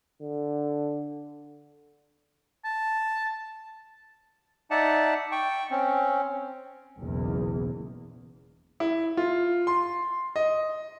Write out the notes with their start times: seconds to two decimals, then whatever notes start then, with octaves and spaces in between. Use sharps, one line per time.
0.21 D3
2.65 A5
4.71 D#4 D5 E5 F#5 A5
5.32 G5 C#6
5.71 C4 C#4
7.00 F#1 B1 E2
8.80 E4
9.17 F4
9.67 C6
10.36 D#5